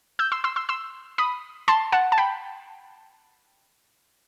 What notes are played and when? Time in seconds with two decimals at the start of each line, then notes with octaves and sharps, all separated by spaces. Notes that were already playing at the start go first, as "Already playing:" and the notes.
0.19 E6 G6
0.32 C6 E6
0.44 C6 E6
0.56 C6 E6
0.69 C6 E6
1.18 B5 D#6
1.68 A5 C6
1.92 F#5 A5
2.12 A5
2.18 G5 B5